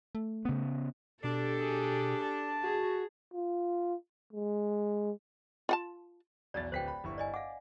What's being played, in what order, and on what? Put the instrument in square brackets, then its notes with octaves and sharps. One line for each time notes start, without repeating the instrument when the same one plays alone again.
[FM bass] A3
[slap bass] C#3 B3
[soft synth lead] B2 [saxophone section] D4 [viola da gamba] G4 A4
[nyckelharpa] G#4
A5
[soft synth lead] F#4 [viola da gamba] G#4
[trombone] F4
G#3
[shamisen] F4 F#5 A5
[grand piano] B1 E2 A6 [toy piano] D5
[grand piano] D1 B4 B6 [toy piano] C5 G5
[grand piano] B5
G1 E4 C#6
[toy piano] D5 D#5 G#5
[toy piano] F5 F#5 [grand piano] D6